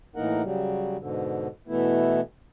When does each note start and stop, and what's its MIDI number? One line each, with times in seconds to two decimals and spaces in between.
0.16 0.42 45
0.16 0.42 52
0.16 0.42 58
0.16 0.42 63
0.16 0.42 70
0.16 0.42 78
0.43 0.97 49
0.43 0.97 54
0.43 0.97 55
0.99 1.48 44
0.99 1.48 47
0.99 1.48 50
1.68 2.20 47
1.68 2.20 52
1.68 2.20 57
1.68 2.20 59
1.68 2.20 64